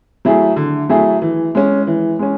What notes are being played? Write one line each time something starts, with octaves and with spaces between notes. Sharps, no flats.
F#3 A3 E4 G#4
D3
F#3 A3 E4 G#4
E3
G#3 C#4
E3
G#3 C#4